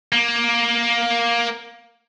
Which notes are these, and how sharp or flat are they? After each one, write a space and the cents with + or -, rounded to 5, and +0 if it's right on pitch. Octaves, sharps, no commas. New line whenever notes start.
A#3 +10